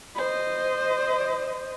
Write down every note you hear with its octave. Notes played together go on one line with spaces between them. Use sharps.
C5 D#5